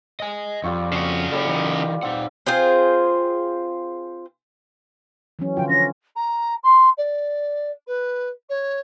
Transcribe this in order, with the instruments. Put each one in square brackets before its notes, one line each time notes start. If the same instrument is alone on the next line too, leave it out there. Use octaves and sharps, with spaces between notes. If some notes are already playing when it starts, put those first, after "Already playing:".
[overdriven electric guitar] D#5 G#5
[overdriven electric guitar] F2 [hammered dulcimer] G3 F4 C#6
[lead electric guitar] C#3 F#4
[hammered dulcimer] G3 [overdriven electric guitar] A4 C#5
[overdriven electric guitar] E3 D#4
[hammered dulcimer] C4 [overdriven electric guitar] D#4 F#5
[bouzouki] C4 F4 G#4 C5
[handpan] E3 F#3 C#4
[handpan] D3 F3 F4 [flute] G5
[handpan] C#4 [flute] A#6
[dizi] A#5
C6
D5
B4
C#5